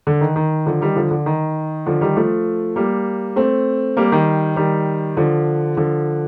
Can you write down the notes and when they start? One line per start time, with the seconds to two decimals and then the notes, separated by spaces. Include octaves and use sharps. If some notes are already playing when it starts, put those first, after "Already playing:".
0.07 D3
0.21 D#3
0.36 D#3
0.66 D3 F3
0.81 D#3 G3
0.96 D3 F3
1.11 D3
1.26 D#3
1.86 D3 F3
2.01 D#3 G3
2.16 F3 A3
2.76 G3 A#3
3.36 A3 C4
3.97 G3 A#3
4.12 D#3 G3
4.56 D#3 G3
5.17 D3 F3
5.77 D3 F3